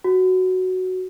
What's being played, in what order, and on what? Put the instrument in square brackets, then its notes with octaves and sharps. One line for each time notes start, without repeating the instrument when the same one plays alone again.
[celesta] F#4